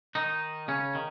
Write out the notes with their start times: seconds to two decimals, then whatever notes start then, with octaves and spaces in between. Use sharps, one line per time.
0.15 D#3 D#4
0.68 C#3 C#4
0.95 D#3